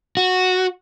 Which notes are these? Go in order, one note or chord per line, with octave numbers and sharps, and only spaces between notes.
F#4